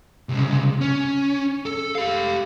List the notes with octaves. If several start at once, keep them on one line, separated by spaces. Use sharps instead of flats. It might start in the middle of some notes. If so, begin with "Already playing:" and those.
C2 C#3
C#4
A4
G4 F5